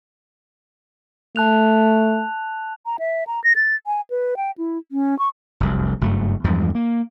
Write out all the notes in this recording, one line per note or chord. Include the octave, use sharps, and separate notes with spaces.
A3 A5 F#6 F7
A#5
E5
A#5
A#6
A6
G#5
B4
G5
E4
C#4
C#6
F1 C2 F#2
F#1 G2 F#3 A3
E2 G2 F3 G#3
A#3